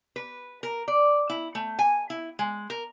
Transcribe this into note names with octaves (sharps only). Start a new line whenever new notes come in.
B4
A#4
D5
E4
A3
G#5
E4
G#3
A#4